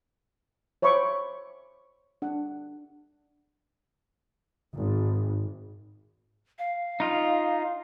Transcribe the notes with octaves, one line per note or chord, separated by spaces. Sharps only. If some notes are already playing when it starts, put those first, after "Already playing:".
C5 C#5 E5 B5 C#6 D6
D4 F#5
G#1
F5
D#4 F4